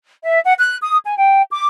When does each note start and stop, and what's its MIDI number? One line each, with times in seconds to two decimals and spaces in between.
0.23 0.39 76
0.44 0.53 78
0.58 0.76 90
0.81 0.96 87
1.04 1.16 80
1.17 1.41 79
1.51 1.67 86